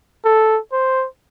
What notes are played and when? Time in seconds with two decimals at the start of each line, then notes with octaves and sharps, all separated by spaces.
0.25 A4
0.72 C5